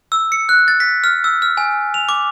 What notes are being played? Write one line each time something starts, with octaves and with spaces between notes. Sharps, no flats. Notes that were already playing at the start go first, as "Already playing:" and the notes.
E6
C#7
F#6
A6
B6
F6
E6
F6
G#5
F7
D6